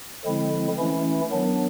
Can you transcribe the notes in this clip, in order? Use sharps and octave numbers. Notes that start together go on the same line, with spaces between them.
D3 F3 G#3 C4 E4
E3 A3 C#4 E4
D#3 F#3 B3 D4